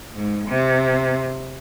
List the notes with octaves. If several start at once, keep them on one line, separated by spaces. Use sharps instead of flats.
G#2
C3